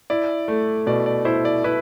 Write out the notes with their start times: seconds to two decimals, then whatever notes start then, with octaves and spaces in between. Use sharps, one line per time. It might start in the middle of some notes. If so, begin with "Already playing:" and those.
0.10 E4 D5
0.48 A3
0.87 B2 D5
1.06 D5
1.25 E4 C5
1.45 D5
1.64 E4 B4